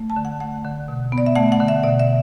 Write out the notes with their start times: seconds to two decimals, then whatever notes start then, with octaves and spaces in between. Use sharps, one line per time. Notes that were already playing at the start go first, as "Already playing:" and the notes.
Already playing: A3
0.10 A5
0.16 D3
0.25 F#5
0.40 A3 F#5
0.65 D3
0.88 B2
1.12 B3
1.18 D5
1.26 E5
1.36 A3 F#5
1.52 F#5
1.60 D3
1.68 E5
1.83 B2 D5
2.00 E5